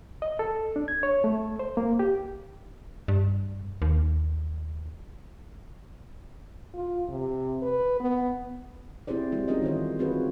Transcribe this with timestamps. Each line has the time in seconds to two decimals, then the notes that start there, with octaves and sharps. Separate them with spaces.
0.22 D#5
0.39 A4
0.76 D4
0.88 G#6
1.03 C#5
1.24 A3
1.59 C5
1.77 A#3
1.99 G4
3.08 G2
3.82 D#2
6.74 F4
7.09 C3
7.62 B4
8.00 B3
9.07 C4 E4 G4 G#4 C5 D5
9.32 D3 G3 G#3 C4 F#4
9.48 C#4 D#4 F4 G#4 A#4 D#5
9.62 D#3 E3 C5
9.99 C4 F4 F#4 G#4 B4